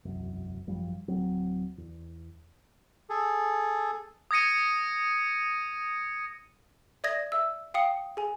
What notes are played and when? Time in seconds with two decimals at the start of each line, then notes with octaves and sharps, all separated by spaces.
0.05 E1 C2 F#2
0.67 G#1 F#2 F3 G3
1.08 D1 F#3 C4
1.78 E2
3.10 G#4 A4
4.31 D#6 G#6 A#6 C#7 D#7
7.04 D5 E5 D#6 G#6 A#6
7.32 E5 E6
7.74 F5 G5 D#6 C#7
8.17 G#4 G#5